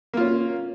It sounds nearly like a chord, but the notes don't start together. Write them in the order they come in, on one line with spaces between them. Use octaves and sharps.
A#3 F4 C#4